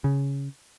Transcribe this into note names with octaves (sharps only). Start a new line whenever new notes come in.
C#3